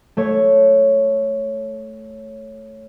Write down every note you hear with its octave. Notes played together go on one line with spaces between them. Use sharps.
A3 C#5